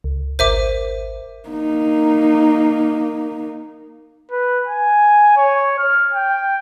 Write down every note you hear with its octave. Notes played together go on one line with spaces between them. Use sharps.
C#2
G#1 A#4 C5 E5 D6 D#7
A#3 D#4
B4
G#5
C#5
F6
G5